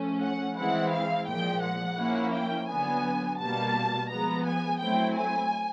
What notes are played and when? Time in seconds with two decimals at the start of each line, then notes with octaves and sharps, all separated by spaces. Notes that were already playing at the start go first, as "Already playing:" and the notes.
Already playing: F3 A3 C#4
0.22 F#5
0.56 E3 G#3 C4 E4 F#5
0.92 F5
1.27 A#2 F3 G#3 G5
1.62 F#5
1.98 F3 A#3 C#4 E4
2.34 G5
2.68 D3 F#3 B3 G#5
3.39 B2 G3 A#3 A5
4.10 F3 G#3 B3 A#5
4.45 G#5
4.80 F#3 A3 C4 E4 G5
5.15 G#5